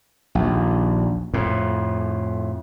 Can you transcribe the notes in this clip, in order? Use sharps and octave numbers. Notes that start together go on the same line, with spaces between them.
A#1 D#2
F2 A2